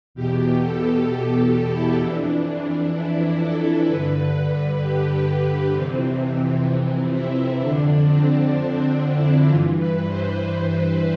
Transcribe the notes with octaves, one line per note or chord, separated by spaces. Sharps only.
E2 B2 G4
A4
A4
G4
E4
F2 E3 D4
D4
E4
A4
G2 D3 B4
G4
G4
F2 C3 E3 C4
E4
F2 D3 D4
C4
D4
C4
E4
G2 E3 F4
B4
C5
C5
B4